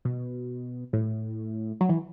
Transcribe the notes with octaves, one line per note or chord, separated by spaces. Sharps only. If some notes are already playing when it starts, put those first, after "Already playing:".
B2
A2
F#3
E3